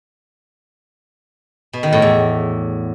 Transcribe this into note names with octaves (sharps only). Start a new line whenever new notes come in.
B2
D#3
A2
E2